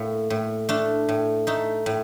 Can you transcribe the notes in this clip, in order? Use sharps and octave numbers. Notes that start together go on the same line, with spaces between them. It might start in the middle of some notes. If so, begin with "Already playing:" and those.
Already playing: A2 A#3
A2
A3 D4
A2
A3 D#4
A2